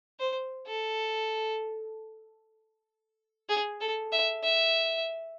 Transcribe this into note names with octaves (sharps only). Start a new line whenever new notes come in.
C5
A4
G#4
A4
E5
E5